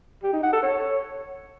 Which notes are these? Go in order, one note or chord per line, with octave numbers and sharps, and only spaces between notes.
G4
D#4
F#5
A4
C#5